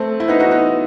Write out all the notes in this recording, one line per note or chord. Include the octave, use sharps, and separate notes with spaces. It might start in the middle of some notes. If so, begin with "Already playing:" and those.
Already playing: A3 C4
E4
B3 D#4
D#4 F#4
B3 D#4